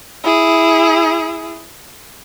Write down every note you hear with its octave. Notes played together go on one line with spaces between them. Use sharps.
E4 G#4